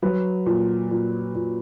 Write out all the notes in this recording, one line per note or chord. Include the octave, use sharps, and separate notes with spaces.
F#3 B4
A#2
A#2
A#2